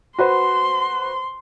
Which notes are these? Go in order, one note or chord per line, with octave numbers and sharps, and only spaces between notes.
F#4 B4 C5 C6